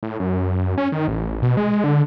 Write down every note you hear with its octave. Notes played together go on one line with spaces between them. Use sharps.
A2
F#2
C#4
D#3
A1
B2
G#3
D3